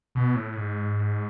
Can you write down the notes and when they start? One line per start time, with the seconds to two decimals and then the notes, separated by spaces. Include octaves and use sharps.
0.15 B2
0.35 A2
0.56 G#2